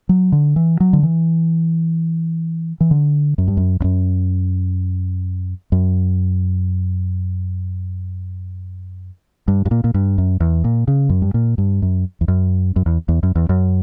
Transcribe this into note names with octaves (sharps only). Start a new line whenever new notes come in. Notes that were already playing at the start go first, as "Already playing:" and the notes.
F#3
D3
E3
F#3
D3
E3
E3
D3
F#2
G2
F#2
E2
F#2
F#2
G2
G2
A#2
A#2
G2
F#2
E2
A#2
C#3
F#2
G2
A#2
G2
F#2
E2
F#2
F#2
E2
E2
F#2
E2
F#2